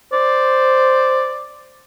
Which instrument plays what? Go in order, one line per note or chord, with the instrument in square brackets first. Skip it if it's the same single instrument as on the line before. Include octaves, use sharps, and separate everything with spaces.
[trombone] C5 [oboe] D5